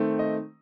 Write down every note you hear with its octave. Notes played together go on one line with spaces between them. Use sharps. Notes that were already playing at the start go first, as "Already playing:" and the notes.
Already playing: D#3 A3 C4
D#5